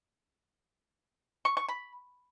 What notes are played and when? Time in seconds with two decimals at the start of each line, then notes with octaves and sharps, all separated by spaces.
1.45 C#6
1.57 C#6
1.68 B5